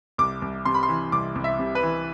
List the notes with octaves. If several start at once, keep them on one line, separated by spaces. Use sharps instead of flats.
C2 D6
C2
C3 C6
B5
C6
E3
C2 D6
C2
E5
C3
B4
E3